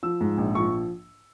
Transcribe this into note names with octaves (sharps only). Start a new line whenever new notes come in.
F3 E6
G#2
A#1
F3 C#6